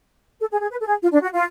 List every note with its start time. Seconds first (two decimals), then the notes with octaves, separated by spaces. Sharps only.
0.40 A4
0.51 G#4
0.61 G#4
0.71 B4
0.81 A4
0.87 G#4
1.02 F4
1.13 D4
1.22 F#4
1.33 F4